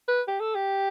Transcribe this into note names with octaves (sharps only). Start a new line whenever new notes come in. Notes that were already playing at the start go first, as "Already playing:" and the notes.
B4
G4
A4
G4